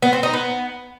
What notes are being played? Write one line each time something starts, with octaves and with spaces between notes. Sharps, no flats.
B3
C4
D#4
B3